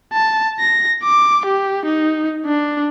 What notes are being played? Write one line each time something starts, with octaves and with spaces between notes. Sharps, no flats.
A5
A#6
D6
G4
D#4
D4